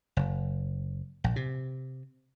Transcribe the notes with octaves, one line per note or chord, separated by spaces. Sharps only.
F#1
A#1
C3